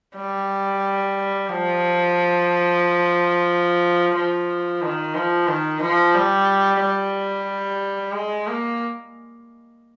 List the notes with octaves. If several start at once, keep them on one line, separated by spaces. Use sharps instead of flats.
G3
F3
F3
D#3
F3
D#3
F3
G3
G3
G#3
A#3